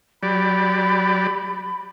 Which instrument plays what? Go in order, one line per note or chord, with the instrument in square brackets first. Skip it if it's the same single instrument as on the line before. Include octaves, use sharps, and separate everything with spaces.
[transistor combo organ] F#3 G4 D5 [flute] B5